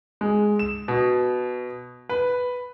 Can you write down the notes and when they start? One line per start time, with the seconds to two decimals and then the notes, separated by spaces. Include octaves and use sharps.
0.21 G#3
0.59 E7
0.88 B2
2.09 B4